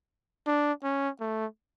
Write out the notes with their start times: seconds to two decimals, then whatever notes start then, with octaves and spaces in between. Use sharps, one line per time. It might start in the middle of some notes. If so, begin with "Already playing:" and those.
0.47 D4
0.83 C#4
1.20 A3